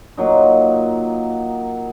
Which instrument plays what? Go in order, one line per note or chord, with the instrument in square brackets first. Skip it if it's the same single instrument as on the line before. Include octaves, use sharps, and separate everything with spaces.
[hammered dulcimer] A#2 F#3 D#4